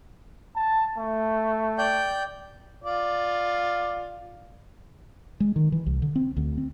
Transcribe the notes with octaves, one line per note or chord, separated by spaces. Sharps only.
A5
A3
D5 G5 G6
F4 D5
G#3
D#3
E3
C2
D3
C4
D2
C4